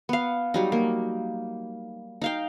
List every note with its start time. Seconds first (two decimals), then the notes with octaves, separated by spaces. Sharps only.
0.09 B3 F5
0.54 F#3 G3 D#4
0.72 A#3
2.21 D#4 F5 G5